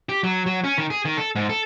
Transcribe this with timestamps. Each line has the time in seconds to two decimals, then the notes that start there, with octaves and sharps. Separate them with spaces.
0.09 G4
0.23 F#3
0.46 F#3
0.64 C#4
0.78 D#3
0.90 G#4
1.05 D#3
1.17 A4
1.35 G#2
1.49 A4